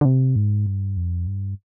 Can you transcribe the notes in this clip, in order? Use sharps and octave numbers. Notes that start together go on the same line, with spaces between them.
D3
C3
G#2
G2
F2
G2